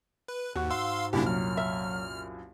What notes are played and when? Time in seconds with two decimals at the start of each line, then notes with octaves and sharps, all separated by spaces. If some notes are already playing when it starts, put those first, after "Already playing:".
0.28 B4
0.56 D#2 G#2 F#4
0.70 F5 C6 E6
1.13 C2 F#2 A#2 D4 E4 G4
1.26 F#3 F6
1.57 E5